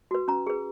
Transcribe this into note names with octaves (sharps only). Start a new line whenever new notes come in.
F#4 B4
C#4 A#5
G#4 B4